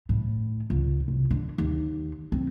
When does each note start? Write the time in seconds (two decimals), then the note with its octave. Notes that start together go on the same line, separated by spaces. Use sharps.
0.09 A2
0.70 C#2
1.08 C2
1.31 D3
1.58 D#2
2.32 C4